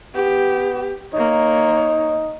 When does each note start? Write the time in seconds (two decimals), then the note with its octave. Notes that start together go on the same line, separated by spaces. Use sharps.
0.15 B3 G4
1.14 A#3 D#4 C#5